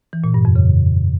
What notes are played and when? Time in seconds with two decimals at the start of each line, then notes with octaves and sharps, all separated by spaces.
0.13 E3
0.24 A#2
0.34 G2
0.45 F2
0.56 C#3